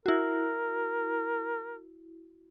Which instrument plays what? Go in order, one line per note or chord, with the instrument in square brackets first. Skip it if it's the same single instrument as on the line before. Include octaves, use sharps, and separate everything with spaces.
[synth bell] E4 F#4 [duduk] A#4